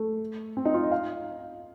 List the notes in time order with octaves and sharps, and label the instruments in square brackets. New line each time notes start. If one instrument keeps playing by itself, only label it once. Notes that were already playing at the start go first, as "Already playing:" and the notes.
Already playing: [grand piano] A3
C4
D#4
F4
D#5
F5